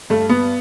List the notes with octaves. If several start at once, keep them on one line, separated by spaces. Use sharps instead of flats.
G2 A3
B3